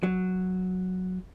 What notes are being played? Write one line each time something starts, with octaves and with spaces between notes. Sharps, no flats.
F#3